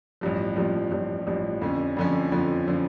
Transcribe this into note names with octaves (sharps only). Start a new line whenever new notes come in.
A1 G2 F3
A1 G2 F3
A1 G2 F3
A1 G2 F3
F2 D3 F3 C#4
F2 D3 F3 C#4
F2 D3 F3 C#4
D3 F3 C#4